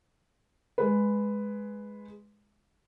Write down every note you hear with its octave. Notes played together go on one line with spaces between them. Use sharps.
G#3 B4